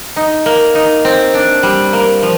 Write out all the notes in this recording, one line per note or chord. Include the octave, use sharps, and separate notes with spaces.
D#4
A#3
D#4
C4
D4
G3
A#3
F3